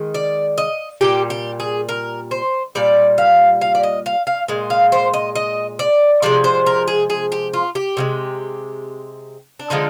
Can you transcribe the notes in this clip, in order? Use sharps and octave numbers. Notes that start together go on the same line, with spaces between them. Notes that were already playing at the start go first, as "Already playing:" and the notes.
Already playing: D#3 G#3
D5
D#5
A#2 G3 G4
G4
G#4
A#4
C5
A#2 G3 D5
F5
F5
D5
D#5
F5
F5
A#2 G#3
F5
C5
D#5
D#5
D5
C3 F3 G#3 D5
C5
A#4
G#4
G#4
G4
F4
G4
C3 F3 G#3
D4
D3 F3 G#3 D#4